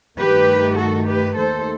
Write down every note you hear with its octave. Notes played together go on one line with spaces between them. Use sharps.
G2 D#3 A3 G4 B4
F#4 A4
G4 B4
D#2 D#3 A3 A4 C5